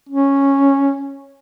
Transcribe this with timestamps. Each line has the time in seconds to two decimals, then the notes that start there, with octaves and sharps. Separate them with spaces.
0.09 C#4